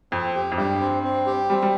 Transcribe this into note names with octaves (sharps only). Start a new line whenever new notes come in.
F2 C4
G4
F2
G2 G4
C4
C4
G4
G3 C4
G3